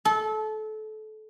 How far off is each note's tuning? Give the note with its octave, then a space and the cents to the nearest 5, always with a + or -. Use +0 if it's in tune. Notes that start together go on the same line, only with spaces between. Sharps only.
A4 -25